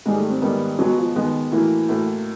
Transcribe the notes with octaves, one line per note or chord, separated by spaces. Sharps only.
G#2 D#3 G3 G#3 A#3
A3
C4
G#2 D#3 G3 A#3 B3
B2 F#3 G#3 B3
F3
B2 D#3 G#3 B3
A2 E3 F#3 A#3
A2 F#3 A#3